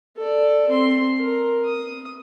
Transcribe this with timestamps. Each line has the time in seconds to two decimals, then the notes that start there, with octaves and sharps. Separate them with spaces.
0.17 A4 D5
0.69 C4 C6
1.18 A#4
1.65 D#6